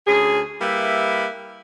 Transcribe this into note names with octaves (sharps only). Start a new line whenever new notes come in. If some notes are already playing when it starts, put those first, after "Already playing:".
D2 C#4 G#4
G3 A#3 E4 B4 E5